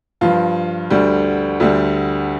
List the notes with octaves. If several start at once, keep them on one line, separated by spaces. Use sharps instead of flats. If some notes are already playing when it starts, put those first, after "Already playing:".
G2 F3 F4
D2 D3 G3
D2 D3 G3